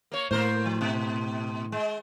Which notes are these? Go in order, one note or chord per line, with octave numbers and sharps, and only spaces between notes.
A#3 C#5
A2 A#3 A#4 C5
F3
B2
G#3